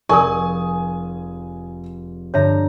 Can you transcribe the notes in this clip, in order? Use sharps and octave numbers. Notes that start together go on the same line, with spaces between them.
F1 G#4 A#4 D5 G#5 C#6 D#6
G2 D3 C#5 E5 A#5